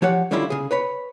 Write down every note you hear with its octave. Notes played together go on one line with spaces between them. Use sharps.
F3 G4 C#5 F#5
D3 D#3 G3 C#4 E4 F4
C#3 G#4
B4 C#5 B5